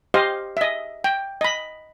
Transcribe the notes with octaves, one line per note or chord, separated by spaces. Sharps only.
G4 C5 D#5 F5
D#5 E5
G5
D#5 B5